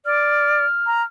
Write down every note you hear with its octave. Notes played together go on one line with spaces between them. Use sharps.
D5 F6
A#5